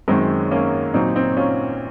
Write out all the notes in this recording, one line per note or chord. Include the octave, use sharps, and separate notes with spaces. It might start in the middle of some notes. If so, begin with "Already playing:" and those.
F#2 D#3 F#3 G#3 C4
A#3 C#4
A#2 F#3 C4 D#4
C4 D#4
C#4 F4